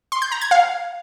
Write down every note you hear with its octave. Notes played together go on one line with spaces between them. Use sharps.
C6
G6
A#5
G#6
F5